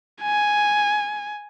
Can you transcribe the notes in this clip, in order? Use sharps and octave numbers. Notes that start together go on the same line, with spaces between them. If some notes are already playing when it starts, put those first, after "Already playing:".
G#5